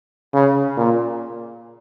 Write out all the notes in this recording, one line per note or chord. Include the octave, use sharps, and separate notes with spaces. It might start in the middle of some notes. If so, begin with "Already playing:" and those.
C#3
A#2